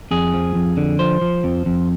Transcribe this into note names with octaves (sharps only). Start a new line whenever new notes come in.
F2 G#4
F3
F2
D3
F3 C5
F3
F2
F2